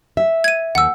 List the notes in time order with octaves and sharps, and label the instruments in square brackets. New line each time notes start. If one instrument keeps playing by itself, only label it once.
[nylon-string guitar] E5
[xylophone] G#6 D#7
[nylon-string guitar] D#2 [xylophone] F#5 E6